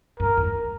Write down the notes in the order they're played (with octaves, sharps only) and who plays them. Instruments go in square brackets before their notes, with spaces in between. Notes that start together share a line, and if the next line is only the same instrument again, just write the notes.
[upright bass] G2 [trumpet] A#4
[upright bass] E2